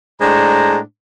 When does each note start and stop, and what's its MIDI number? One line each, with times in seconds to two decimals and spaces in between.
0.21 0.78 45
0.21 0.78 56
0.21 0.78 62
0.21 0.78 72
0.21 0.78 82